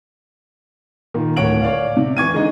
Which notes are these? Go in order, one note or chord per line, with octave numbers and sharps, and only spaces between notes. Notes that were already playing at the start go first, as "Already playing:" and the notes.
A#2 D#3
D1 A2 C#5 F#5 D7 F#7
C#5 D5 F5
C3
E3 C#6 G#6 D#7
D3 G#3 D#4 D#5